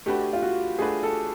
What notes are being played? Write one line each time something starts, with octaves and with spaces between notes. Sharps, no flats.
A3 D4 F#4 G4 B4
F4
F#4
A3 D4 F#4 G#4 B4
A4